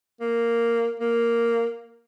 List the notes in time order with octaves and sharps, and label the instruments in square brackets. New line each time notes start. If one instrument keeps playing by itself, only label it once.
[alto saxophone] A#3
A#3